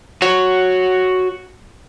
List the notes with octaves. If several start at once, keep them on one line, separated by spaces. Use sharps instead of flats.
F#4 C#5